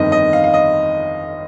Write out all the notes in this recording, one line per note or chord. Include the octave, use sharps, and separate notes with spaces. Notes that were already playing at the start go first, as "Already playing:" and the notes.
Already playing: G1 F2 D#3 D#5
D#5
F5
F5
D#5